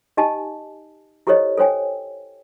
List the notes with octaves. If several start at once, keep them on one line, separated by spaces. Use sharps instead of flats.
D#4 G4 D#5 G#5 A5
E4 G4 A4 C5 C#5 D#5
A4 C5 C#5 G5 G#5